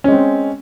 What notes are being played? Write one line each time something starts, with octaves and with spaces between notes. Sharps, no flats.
G#3 C4 C#4